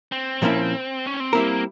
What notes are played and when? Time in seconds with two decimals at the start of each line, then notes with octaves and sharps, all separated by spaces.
0.12 C4
0.42 A#2 F3 A#3 C#4 E4
1.07 C#4
1.20 C4
1.33 G3 A#3 C4 E4 A#4